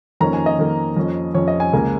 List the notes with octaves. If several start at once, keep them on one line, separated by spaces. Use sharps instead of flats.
F2 D#3 A#3 C#4 A#5
G#5
D#5
F2 D#3 A#3 C#4
F2 F3 C#4
F2 F3 C#4 C#5
D#5
G#5
C#2 C#3 A#3